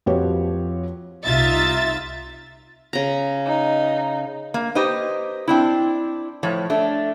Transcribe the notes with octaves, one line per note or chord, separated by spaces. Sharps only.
F2 F3 F#4 G4 B4 C#5
C2 D#4 F4 E5 A6
C#3 A#5
D#4
A#3
D#4 G4 B4 C5 D#5
C4 D4 E4
A2 F3 C#5
A3 D4